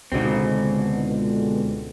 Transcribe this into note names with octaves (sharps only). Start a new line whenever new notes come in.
C#2 G#2 B2 D3 C4